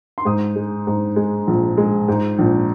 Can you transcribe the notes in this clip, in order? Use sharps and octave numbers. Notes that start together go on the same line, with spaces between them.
C6
G#2 D#6
G#3
G#2
G#3
A#1
G#3
G#2
A#1